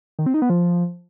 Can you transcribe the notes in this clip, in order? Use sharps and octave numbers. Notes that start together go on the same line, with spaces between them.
D#3
C4
D#4
B3
F3